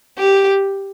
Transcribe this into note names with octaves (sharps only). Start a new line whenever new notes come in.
G4